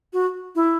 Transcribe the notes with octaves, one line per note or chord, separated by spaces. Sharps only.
F#4
E4